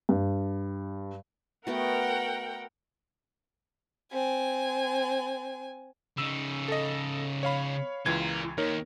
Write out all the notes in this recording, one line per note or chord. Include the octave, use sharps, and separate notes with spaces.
G2
A3 B3 F#4 A#4 F#5 G5
C4 G#5
C#3 D#4 E6
A4 D#5
C#5 F5 B5
C#2 E3 F4 A#4 G#6
D#2 D#4 A#4 C#5